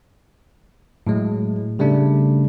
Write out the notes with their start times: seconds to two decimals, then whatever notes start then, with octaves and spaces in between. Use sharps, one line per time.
1.07 A2 F#3 G#3
1.79 C#3 G3 A3 D4